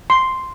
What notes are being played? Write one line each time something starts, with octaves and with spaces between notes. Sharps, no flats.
C6